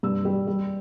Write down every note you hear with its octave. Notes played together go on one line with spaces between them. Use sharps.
G2 E6
G3
G3